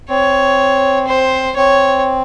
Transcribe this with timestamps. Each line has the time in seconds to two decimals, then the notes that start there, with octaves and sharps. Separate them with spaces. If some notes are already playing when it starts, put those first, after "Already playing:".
0.09 C4 C#5
1.07 C5
1.56 C4 C#5